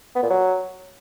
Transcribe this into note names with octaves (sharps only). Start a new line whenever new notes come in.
B3
A#2
F#3